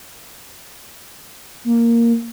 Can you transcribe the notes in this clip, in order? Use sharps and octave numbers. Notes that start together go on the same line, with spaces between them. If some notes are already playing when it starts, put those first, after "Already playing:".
A#3